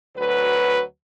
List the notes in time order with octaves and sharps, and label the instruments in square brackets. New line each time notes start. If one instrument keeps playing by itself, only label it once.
[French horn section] D2 F#3 B4